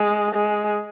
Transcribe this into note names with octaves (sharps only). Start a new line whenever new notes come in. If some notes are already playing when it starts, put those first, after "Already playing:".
Already playing: G#3
G#3